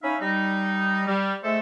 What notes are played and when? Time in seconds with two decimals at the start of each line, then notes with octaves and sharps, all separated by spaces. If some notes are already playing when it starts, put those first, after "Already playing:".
0.03 C#4 D#4 E5 F5 B5
0.20 G3 D#4
1.07 G3
1.43 G#3 A3 A4 C5 E5